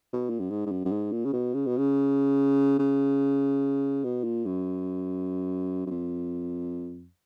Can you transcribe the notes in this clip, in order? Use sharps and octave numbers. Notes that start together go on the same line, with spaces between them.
B2
A#2
F#2
G#2
G#2
F#2
F#2
G#2
A#2
C#3
B2
C#3
B2
C#3
C#3
B2
A#2
F#2
F#2
F2